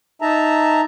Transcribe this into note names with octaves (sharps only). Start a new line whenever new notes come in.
D#4 E5 A5 A#5